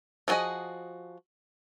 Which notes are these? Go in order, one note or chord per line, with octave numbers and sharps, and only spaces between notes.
F3 C4 F#4 G#4 D#5